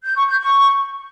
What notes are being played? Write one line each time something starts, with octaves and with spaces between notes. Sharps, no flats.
G6
C#6
G6
C#6